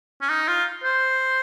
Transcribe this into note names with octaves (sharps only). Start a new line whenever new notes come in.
C#4
D#4
F4
C5